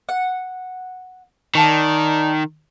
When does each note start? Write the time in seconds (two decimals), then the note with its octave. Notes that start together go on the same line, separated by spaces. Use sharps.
0.09 F#5
1.55 D#3 D5 A5 C#6